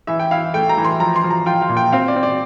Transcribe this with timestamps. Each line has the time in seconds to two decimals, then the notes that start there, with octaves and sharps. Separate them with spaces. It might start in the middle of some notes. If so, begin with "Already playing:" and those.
0.07 E3 E5
0.19 G5
0.31 E4 F5
0.54 A3 G5
0.69 A#5
0.78 E3
0.85 C6
1.00 F3 A#5
1.16 C6
1.24 F3
1.31 A#5
1.46 F4 G5
1.62 F5
1.69 A#2
1.77 G5
1.92 C4 F5
2.08 D5
2.16 C4
2.23 D5